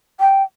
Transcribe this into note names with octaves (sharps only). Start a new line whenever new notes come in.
G5